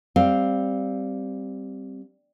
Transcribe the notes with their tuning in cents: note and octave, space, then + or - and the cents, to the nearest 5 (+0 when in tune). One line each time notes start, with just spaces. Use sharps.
G3 +0 C4 +0 F5 +0